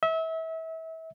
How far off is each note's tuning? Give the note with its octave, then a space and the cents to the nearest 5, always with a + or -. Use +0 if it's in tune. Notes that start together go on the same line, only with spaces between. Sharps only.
E5 -30